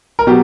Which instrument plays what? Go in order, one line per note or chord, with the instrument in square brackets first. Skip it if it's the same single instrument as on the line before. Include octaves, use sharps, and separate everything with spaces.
[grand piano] A#4
B2 F#3 G4